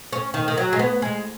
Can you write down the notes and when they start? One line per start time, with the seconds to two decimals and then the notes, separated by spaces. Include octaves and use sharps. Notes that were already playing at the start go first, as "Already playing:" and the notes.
0.13 C#4
0.34 D#3
0.48 D#3
0.58 F#3
0.73 G#3
0.79 B3
1.02 G#3